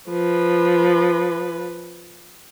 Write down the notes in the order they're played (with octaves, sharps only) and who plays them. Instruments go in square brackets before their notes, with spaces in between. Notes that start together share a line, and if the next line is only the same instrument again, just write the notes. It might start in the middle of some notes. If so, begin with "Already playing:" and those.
[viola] F3 B4